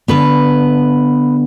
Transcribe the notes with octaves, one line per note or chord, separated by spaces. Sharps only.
D3 B3 B4